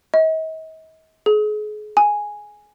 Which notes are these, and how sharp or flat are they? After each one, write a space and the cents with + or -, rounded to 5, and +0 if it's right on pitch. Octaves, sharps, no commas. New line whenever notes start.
D#5 +40
G#4 +35
G#5 +0